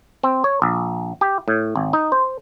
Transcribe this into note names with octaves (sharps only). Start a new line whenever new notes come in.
C4
C#5
A#1
G4
A2
G#1
D#4
C5